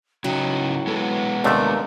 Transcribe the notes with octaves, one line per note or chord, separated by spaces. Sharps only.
C#3 F#3 D#4 E4 F#4 G5
G#3 B3 A4
F#5
D#2 C3 A3 D4 A#4